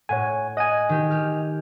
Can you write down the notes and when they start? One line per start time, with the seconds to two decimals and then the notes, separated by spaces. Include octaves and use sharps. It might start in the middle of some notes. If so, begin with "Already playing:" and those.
0.09 A2 C#5 F#5 G#5
0.57 D#5 F#5 G#5 D#7
0.89 D#3 G4
1.11 G4 F6